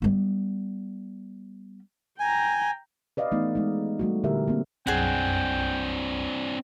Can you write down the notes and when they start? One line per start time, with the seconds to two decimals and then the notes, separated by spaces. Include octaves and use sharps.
0.02 G3 B3
2.20 G5 G#5 A#5
3.17 B4 D5 D#5 F5
3.31 E3 A3 B3 D#4
3.55 G#3 D#4
3.99 G3 A3 F#4
4.23 A#2 D3 E4 G4 A#4 E5
4.48 A#3 C4
4.87 B1 F#2 C4 D4 G#4 F#5 G5